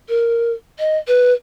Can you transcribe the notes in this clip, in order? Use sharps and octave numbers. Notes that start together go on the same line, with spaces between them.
A#4
D#5
B4